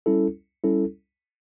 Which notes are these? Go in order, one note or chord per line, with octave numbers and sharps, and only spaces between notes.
G3 C#4 E4 A4
G3 C#4 E4 A4